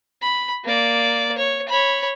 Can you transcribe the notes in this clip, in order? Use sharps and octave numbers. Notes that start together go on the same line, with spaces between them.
B5
A#3 D5
C#5
C#5 B5